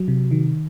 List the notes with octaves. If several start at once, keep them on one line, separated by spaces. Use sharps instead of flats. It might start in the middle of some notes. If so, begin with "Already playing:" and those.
Already playing: F#3
C3
D#3